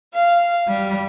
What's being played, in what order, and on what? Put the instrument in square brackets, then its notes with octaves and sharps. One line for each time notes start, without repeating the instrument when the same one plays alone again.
[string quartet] F5
G3